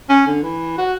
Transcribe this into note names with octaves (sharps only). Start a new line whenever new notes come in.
C#4
D3
E3
F#4